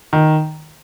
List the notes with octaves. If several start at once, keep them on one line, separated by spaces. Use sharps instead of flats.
D#3